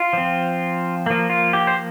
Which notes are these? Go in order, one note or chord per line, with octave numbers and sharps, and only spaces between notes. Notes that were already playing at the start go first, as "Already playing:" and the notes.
Already playing: F4
F3 C4
F3 A#3
F4
G4
C5